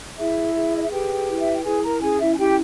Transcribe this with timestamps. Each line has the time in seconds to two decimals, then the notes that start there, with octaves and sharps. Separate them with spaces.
0.18 E4 G#4 E5
0.55 G#4
0.75 D#5
0.83 E5
0.91 G4 B4 G5
1.28 E4
1.39 E5
1.53 G5
1.65 E4 G#4 G#5
1.84 A#4 A#5
2.01 C#4 G#4 G#5
2.20 E4 E5
2.34 G#5
2.38 E4 G4 G5